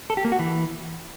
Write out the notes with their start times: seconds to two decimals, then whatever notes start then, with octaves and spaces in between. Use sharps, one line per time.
0.10 A4
0.17 G4
0.25 A#3
0.32 F#4
0.39 E3